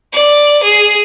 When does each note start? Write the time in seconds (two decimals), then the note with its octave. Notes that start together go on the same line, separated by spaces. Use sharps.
0.13 D5
0.63 G#4